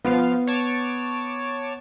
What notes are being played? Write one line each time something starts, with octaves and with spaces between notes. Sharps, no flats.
F3 B3 F4 F5
C#5 A5 D6